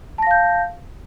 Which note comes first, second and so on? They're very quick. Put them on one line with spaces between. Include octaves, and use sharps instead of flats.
A5 A#6 F5 G6